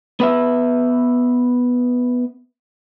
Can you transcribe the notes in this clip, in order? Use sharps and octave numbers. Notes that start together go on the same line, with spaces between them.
B3 B4 E5